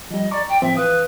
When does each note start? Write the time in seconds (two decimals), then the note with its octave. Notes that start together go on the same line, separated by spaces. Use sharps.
0.11 F3 G3 D#5
0.31 D5 A#5 C#6 D6
0.49 G5
0.62 A2 F3 C4 E5
0.76 E3 B4 F5 D#6